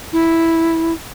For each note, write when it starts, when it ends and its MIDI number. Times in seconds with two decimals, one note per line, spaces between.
0.13 0.93 64